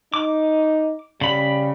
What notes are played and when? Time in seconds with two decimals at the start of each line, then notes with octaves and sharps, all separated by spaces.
0.14 D#4 D6
1.21 C#3 G3 B5